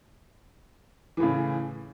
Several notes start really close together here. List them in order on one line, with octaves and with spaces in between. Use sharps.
E3 A2 C#3